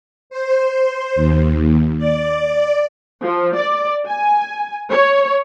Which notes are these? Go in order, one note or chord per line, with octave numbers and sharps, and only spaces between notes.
C5
D#2
D5
F3
D5
G#5
C#5